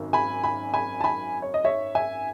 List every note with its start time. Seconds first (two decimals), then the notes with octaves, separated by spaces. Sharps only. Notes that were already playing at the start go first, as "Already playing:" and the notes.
Already playing: G#1 F#2
0.13 G#5 B5
0.43 G#5 B5
0.74 G#5 B5
1.01 A5
1.04 G#5 B5
1.42 C#5
1.54 D#5
1.64 C#5 E5
1.95 E5 G#5